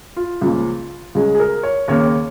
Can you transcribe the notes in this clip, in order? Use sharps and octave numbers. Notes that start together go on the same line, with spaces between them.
F4
C#2 C#3 F3 A#3
C#2 C#3 G#3
G#4
A#4
C#5
D#2 C#3 A#3 C#5